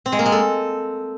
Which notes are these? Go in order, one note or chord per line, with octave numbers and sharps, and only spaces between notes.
C4
G#3
A#3
G#3
A4